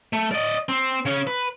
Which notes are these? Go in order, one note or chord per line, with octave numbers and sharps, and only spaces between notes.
A3
D5 D#5
C4
C#3 C#4
B4